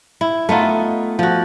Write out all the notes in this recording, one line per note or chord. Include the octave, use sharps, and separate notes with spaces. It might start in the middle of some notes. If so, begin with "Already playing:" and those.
E4
A3 B3 D#4 F4
F3 F#4